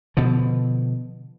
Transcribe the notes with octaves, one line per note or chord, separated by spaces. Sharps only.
B2 D3 F3